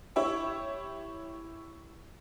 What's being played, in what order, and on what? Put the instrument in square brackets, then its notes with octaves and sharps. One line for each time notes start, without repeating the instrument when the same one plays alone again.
[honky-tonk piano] E4 G4 C#5 E5 G5